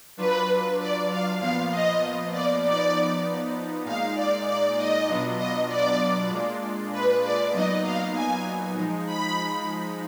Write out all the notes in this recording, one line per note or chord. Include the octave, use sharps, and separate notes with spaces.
F#3 D4 F4 B4
D5
F5
A#2 F3 B3 F4 F5
D#5
D5
F3 B3 D#4 D5
A#2 G#3 D#4 F5
D5
D5
D#5
B2 F#3 B3 D4 F4
D#5
D5
A#2 G#3 D4 F4
B4
D5
A#2 F#3 B3 D#4 D#5
F5
G#5
F3 G#3 D#4
B5